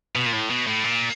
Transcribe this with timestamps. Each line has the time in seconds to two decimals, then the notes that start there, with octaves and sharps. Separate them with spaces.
0.15 B2
0.26 A#2
0.33 A2
0.50 B2
0.67 A2
0.84 A#2